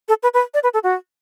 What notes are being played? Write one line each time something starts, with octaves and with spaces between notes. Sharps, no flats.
A4
B4
B4
D5
B4
A4
F#4